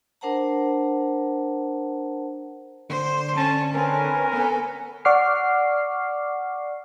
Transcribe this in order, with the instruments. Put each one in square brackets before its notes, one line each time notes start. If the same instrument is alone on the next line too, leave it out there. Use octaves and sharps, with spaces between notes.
[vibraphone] D4 A#4 C5 F#5 A5 A#5
[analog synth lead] D3 [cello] C5
[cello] C#4 [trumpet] A5
[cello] C4 [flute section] C#4 B4 G#5 [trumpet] A#4
[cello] B3 A4
[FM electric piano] D5 F#5 C#6 D6 F6 C7